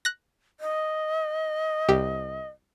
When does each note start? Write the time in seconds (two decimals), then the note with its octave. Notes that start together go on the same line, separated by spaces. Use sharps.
0.05 F#6 A#6
0.60 D#5
1.89 C2 G4